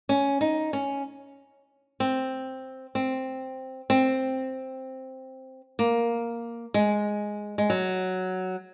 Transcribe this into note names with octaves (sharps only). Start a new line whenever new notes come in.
C#4
D#4
C#4
C4
C4
C4
A#3
G#3
G#3
F#3